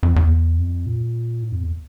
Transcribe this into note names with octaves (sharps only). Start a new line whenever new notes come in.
F2
E2
F2
A#2
A2
F2
E2